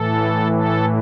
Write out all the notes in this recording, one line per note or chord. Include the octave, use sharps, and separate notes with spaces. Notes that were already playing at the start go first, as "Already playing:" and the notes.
Already playing: A2 E3 A4
A4